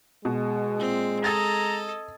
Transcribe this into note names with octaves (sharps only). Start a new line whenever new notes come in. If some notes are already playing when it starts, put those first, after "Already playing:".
B2 G#3
A#2 C4
A4 D#5 A#5 D#6 G#6 A6